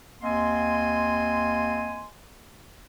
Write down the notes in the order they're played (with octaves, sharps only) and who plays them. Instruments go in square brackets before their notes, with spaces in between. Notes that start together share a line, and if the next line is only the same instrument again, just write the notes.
[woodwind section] D#2 A#3 C4 D#5 G#5 C6